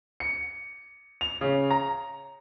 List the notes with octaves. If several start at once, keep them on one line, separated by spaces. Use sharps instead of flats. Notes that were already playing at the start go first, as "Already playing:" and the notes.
C#7
F7
C#3
A#5